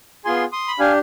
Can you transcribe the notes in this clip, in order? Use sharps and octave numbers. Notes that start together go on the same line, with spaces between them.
B3 F4 G#4 G#5 C6
C6 D#6
B5
D4 G4 F5 G#5